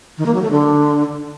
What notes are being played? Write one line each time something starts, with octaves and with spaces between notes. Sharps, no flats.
D#3
A#3
F#3
A3
D3